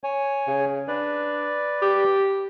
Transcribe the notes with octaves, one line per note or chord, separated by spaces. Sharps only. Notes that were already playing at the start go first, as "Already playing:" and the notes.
C#5 G#5
C#3
D4 B4 D5
G4